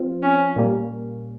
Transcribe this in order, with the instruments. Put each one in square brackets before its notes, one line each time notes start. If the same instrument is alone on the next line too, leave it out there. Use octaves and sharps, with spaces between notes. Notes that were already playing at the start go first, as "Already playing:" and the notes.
Already playing: [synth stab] F3 C4 F4
[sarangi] C#4
[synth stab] A#2 G3 A#3